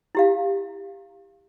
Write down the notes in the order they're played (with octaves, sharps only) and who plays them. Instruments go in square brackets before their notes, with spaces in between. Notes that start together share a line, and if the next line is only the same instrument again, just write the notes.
[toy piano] E4 G4 F5